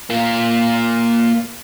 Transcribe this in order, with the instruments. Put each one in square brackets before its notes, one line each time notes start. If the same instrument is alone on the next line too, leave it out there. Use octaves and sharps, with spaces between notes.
[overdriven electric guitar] A#3 F4